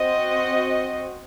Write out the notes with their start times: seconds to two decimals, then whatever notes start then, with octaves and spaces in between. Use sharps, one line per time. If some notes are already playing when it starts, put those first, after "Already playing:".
Already playing: C4 F#4 D#5